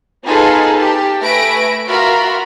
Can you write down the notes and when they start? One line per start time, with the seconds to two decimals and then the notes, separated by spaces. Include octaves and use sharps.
0.24 B3 D#4 F4 G#4 A4 B4
0.78 G4 A5
1.22 A3 B4 E5 G#5 A#6 D7
1.89 F4 F#4 A#4 E5 A#5 B5